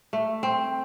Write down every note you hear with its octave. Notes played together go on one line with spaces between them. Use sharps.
A3
C4